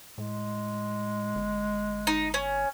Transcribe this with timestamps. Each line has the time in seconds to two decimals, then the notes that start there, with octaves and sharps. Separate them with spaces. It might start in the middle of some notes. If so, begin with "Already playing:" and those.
0.18 A2 G#3
1.35 G1
2.07 D#4
2.34 C#4